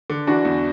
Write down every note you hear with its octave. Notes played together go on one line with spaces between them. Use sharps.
D3
E3 D4 F#4
E2